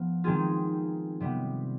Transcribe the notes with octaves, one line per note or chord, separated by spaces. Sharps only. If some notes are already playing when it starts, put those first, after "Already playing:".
Already playing: F3 B3
D#3 G#3 C4 F4 G#4
C3 G3 B3